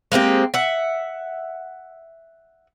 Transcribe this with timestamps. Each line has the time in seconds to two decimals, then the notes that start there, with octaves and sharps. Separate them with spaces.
0.12 G#3 A#3 C4 G4
0.54 E5 F#5